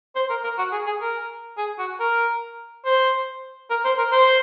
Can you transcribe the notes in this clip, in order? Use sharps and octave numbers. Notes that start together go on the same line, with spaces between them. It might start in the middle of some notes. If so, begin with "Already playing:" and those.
C5
A#4
A#4
F#4
G#4
G#4
A#4
G#4
F#4
A#4
C5
A#4
C5
A#4
C5